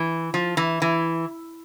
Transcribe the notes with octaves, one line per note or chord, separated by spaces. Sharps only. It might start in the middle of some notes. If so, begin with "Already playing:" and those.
Already playing: E3
F3
E3
E3